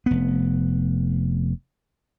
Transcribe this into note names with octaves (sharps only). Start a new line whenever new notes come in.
F1 B3